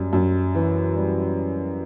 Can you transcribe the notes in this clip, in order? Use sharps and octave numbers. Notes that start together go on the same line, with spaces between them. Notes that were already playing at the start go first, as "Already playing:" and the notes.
Already playing: F#2 G3
F#2
E3
G3